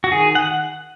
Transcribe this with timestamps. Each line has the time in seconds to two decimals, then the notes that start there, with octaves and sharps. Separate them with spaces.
0.04 F#4
0.12 D#3 G#4
0.35 F#5